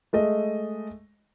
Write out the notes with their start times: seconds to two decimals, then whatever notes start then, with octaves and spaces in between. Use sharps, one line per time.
0.13 G#3 A3 D#5